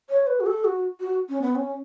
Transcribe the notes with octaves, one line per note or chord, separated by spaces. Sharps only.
C#5
B4
F#4
A4
F#4
F#4
C#4
B3
C#4